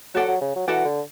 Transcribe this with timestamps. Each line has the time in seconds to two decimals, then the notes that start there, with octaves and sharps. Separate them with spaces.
0.15 F#3 F#4 A4 D5 F#5
0.28 F#3
0.41 C#3
0.56 F#3
0.67 E3 F#4 A4 D5 F#5
0.85 D3